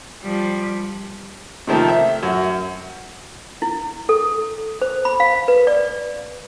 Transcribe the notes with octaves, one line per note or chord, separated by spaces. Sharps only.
F3 G3
C3 D#3 F3 A3
E5
F#2
E4
A4
C5
B5
F5
B4
D5